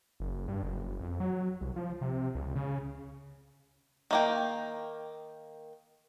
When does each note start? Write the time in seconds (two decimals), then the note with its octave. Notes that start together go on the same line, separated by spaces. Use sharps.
0.20 F#1
0.48 G2
0.63 F#1
1.01 F2
1.20 F#3
1.61 C2
1.76 F3
2.01 C3
2.35 C#2
2.56 C#3
4.11 D#3 A#3 G5